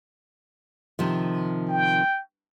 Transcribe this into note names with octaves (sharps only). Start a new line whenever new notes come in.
C3 D#3 F3
G5